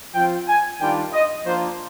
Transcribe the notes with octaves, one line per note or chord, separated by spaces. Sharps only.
F3 C4 F4 G5
G#5
D#3 G3 D4 F4 G5
D#5
F3 A#3 D4 F4 C5